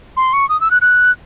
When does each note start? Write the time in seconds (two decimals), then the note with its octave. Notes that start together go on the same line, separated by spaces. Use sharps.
0.17 C6
0.33 C#6
0.49 D#6
0.61 E6
0.71 F#6
0.82 F#6